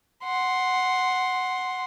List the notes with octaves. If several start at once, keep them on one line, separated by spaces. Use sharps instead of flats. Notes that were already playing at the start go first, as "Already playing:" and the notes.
F#5 C6